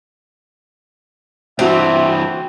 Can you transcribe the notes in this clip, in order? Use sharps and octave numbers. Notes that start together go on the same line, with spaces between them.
G2 E3 C4 F#4 E5 F7